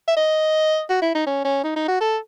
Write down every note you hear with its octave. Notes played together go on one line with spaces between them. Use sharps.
E5
D#5
F#4
E4
D#4
C#4
C#4
D#4
D#4
F#4
A4